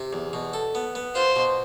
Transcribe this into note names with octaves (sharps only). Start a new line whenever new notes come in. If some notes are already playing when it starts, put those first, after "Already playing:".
Already playing: C3
E2
B2
A4
B3
B3
F4 C5
B2